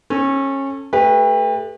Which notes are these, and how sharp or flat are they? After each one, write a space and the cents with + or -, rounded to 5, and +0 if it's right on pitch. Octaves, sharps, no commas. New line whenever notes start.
C#4 -25 A4 +5
A3 +0 G4 +35 B4 -15